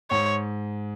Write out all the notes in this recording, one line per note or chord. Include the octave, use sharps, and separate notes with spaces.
G#2 C#5